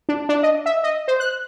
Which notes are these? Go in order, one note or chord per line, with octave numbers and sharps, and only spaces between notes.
D4
D4
D#5
E5
D#5
C5
F#6